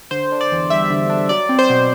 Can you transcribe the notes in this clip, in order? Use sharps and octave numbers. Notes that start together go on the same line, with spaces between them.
D3 C5
D4
D5
E2
G3 E5
D3
D4
F#3 D5
C4
C5
B2